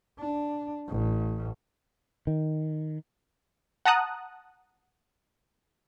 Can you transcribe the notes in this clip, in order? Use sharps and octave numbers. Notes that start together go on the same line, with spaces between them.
D4
A1
D#3
F#5 A5 A#5 D#6 F#6